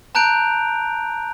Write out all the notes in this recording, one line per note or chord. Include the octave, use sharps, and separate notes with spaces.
A5 A#5 F#6 G6 D7 F7